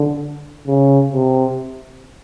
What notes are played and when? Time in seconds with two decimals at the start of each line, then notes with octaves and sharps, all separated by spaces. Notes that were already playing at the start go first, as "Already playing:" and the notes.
Already playing: D3
0.67 C#3
1.13 C3